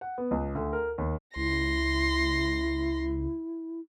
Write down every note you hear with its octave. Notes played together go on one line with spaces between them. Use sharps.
F#5
B3
C#2
D2
A#4
D#2
C#2 E4 C6 A#6